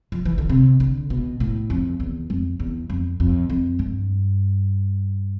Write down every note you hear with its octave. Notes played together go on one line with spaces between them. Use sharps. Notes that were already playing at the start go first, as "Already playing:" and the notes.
F3
E3
D3
C3
D3
B2
A2
F2
E2
F2
E2
F2
F2
F2
G2